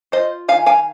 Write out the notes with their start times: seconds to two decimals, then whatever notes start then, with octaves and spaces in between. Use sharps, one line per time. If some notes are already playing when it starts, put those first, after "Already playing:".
0.12 F4 C5 D#5
0.48 D#3 F5 G#5
0.66 F5 G#5